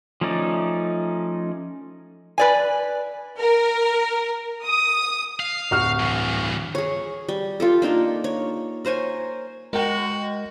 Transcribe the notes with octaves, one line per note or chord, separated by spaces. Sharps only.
F3 A3 C#4 D#4 D5
B4 D5 G#5
A#4
D#6
F5
D1 F#4 F6
G2 E3
G#4 C#5
G3
F4 G4 A4
A#3 D4 D#4 F4
C#5
A#4 C5 C#5 G#5
G#3 F#4 A#4 G5